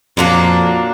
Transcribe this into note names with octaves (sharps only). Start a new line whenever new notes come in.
F2 A#2 F#3 A#3 D4